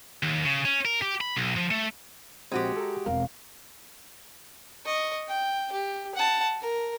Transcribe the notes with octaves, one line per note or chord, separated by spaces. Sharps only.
D#2
C#3
C#4
A#4
G4
B5
B1
F3
A3
A#1 G#3 C4 F#4 G4
A4 A#5
E1 C4 A#4 F5
D#5 C#6
G5
G4
F#5 A5
A#4